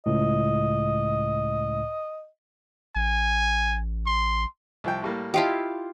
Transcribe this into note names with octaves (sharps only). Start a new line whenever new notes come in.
C#2 A2 D#5
A1 G#5
C6
C2 F3 G5
A2 G3 A#3
E4 F4 G4 D#5 F5 A5